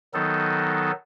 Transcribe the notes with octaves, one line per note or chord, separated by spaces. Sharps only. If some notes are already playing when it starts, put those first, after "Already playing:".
D#3 F#3 B3 D#4 A4